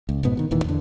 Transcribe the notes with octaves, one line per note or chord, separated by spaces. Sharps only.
C#2
F1 G#2 B2 B3
D#3 F3 B3
E1 A#2 D#3 E3
E2 D3